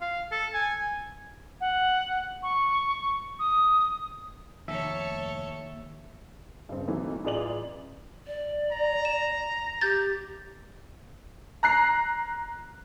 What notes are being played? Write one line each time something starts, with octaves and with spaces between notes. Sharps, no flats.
F5
A4
G#5
F#5
C#6
D#6
F1 D#2 A4 C#5 E5
G2 C#3 C4
C3 D#3 E3 F#3 A3 A#3
A1 F4 G#4 D5 F7 F#7
D5
A#5
E7
G4 G6 A6
A#5 F#6 C7